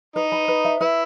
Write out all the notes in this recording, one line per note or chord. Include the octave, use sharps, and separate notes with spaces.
D#4 B4
B5
B4
E5
E4 B4